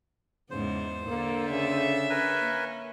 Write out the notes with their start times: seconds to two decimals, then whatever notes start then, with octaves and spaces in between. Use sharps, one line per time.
0.50 E2 G#2 C#3 B3 C5
1.07 D3 A#3 A4
1.50 C#3 E5
2.10 C#4 A#4 B4 G#5
2.42 A#3